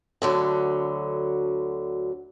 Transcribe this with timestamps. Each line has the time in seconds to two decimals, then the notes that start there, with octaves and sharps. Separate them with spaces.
0.22 D2 D3 F#3